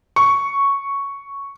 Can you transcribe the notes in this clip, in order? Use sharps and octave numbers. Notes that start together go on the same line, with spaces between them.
C#6